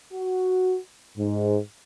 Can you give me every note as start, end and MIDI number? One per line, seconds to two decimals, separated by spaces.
0.13 0.77 66
1.17 1.57 44